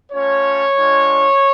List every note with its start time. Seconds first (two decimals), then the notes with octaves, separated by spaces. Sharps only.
0.12 A3 C#4 F4 C#5
0.76 G#3 D4 F4